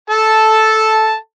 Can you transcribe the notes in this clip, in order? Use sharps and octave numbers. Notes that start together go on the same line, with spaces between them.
A4 A5